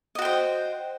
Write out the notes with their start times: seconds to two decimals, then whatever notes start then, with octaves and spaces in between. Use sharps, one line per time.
0.15 D#5
0.18 F#4
0.22 G5
0.25 C5